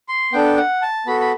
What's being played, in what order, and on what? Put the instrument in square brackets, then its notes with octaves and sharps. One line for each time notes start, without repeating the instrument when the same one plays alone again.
[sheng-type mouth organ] C6
B3 D4 A4 G5
F#5
A5
B3 F#4 A4 B5
B5